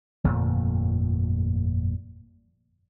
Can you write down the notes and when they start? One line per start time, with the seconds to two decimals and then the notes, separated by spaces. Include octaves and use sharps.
0.24 G1 F2 A#2 A3